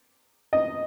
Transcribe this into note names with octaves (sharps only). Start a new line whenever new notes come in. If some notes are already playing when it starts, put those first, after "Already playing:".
D#5